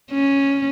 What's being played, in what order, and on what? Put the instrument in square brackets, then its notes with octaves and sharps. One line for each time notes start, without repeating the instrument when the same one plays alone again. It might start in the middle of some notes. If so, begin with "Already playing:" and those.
[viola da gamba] C#4